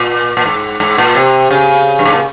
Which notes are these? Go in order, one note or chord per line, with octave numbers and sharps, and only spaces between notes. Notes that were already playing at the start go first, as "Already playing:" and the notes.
Already playing: A#2
A#2
G#2
G#2
A#2
C3
C#3
G2
G#2
A#2